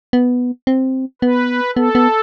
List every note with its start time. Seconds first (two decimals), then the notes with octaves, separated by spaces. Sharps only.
0.13 B3
0.67 C4
1.22 B3 B4
1.76 B3 A4
1.95 B3